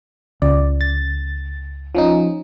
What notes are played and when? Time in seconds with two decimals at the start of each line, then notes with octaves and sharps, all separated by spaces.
0.42 C#2 D5
0.81 A6
1.95 F3 C#4 D#4